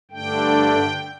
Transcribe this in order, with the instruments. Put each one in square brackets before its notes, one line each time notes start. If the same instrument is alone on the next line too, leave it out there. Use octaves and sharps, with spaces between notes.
[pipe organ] G2 D3 A3 D4 G5